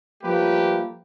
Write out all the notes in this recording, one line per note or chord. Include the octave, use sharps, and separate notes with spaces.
F3 G3 A3 A#3 G4 B4